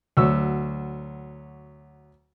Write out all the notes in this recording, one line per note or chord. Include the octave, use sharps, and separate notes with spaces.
D2 F#3 C#6 E6